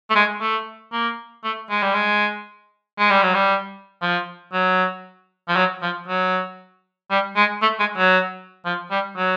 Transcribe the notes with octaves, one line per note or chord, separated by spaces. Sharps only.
A3
G#3
A3
A#3
A3
G#3
G3
G#3
G#3
G3
F#3
G3
F3
F#3
F3
F#3
F3
F#3
G3
G#3
A3
G#3
F#3
F3
G3
F#3